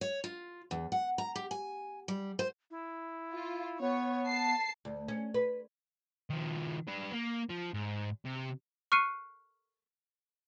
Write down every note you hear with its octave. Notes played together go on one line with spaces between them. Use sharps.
C#5
F4
E2
F#5
A#5
G4
G#5
G3
C5
E4
F4
B3 C#5
A5 C7
D2
C#4
B4
D#3 F3
D4 B4
A#3
F3
G#2
C3
C#6 F6 F#6 C7 C#7 D#7